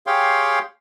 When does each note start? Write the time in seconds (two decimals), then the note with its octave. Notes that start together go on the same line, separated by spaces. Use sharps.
0.07 G4 G#4 C#5 F5 G5 C6